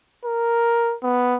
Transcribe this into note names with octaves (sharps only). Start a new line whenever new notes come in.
A#4
B3